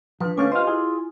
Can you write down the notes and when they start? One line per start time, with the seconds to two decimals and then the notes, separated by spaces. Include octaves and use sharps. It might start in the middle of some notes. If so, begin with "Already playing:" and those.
0.21 F3 D4 B4
0.37 D3 A3 A#3 C#4 B4 F5 G#5
0.52 F4 G4 C5 D#5 F5
0.67 E4 G#4